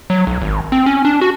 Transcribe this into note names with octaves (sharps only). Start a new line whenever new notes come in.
F#3
B1
G#1
C4
C#4
D4
F#4